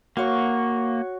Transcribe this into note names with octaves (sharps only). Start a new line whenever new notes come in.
A#3 F#4 C#5 C#6